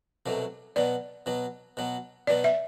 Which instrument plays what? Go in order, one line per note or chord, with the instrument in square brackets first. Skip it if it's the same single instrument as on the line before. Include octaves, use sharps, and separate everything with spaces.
[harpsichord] C2 B2 F#3 A3
[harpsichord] B2 F#3 B3 [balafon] D5
[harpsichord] B2 F#3 B3
B2 F#3 B3
[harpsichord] B2 F#3 B3 [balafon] D5
[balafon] E5